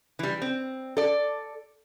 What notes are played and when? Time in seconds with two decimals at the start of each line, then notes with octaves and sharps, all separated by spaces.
0.19 E3 G3
0.42 C4
0.97 A4 D5